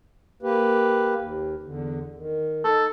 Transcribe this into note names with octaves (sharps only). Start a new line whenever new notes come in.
A#3 G4 B4
D#2
E2 D3
D#3
D#4 A4